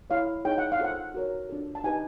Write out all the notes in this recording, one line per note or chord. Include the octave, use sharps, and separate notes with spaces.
E4 A4 C#5 F5
D#4 G#4 C#5 G5
F#5
F5
F4 A4 C5 F#5
F#4 A#4 C#5
D4 F4 A4
A5
D#4 G4 B4 G#5